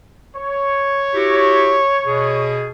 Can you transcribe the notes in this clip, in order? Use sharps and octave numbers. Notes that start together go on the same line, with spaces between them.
C#5
E4 F#4 G4
B2 G#4